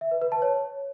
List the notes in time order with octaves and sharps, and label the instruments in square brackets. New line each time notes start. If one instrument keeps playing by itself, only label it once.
[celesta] E5
B4
B4
A5
C#5